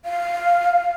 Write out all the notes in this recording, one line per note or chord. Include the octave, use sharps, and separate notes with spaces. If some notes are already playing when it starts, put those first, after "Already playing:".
F5